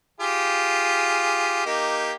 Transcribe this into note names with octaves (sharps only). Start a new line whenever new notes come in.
F4 G4 G#4
A#3 D#4 G4